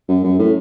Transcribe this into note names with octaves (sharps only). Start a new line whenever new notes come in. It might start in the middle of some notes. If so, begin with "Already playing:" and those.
F#2
F#2
A2